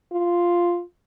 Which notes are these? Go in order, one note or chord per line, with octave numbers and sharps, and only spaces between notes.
F4